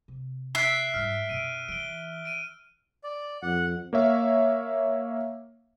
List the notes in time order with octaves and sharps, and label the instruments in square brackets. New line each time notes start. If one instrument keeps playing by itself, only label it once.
[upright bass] C3
[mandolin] E5 [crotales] E6 F#6 D7 [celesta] C7
[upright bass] G#2 G3 [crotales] F6
[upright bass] F#2 B2 [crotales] D7 D#7
[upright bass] E3 [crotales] D7 G7
[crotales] D7 D#7
[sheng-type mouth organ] D5
[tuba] F2 [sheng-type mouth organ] F#5
[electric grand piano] A#3 C#5 E5 F5